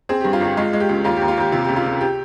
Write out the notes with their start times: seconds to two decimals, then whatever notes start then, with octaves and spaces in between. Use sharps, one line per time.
0.09 C4 G#4
0.21 G2 G4
0.33 F4
0.41 G1 G4
0.57 G#3 F4
0.73 G#3
0.80 G4
0.89 C#2
1.04 D#2 F4
1.16 D#2 G4
1.28 F4
1.37 D#2 G4
1.52 C3 F4
1.64 C#2 G4
1.76 F4
1.86 C#2
2.01 G4